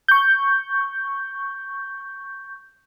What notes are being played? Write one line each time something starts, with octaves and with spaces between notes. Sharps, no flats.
C#6 G6